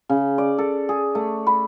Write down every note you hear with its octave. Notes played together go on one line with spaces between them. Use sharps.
C#3
D5
A4
G#4
A3
B5